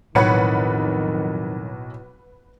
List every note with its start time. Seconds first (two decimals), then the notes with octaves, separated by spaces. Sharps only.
0.15 B1 F2 A2 D#3 B4 C#5 F#5 C#7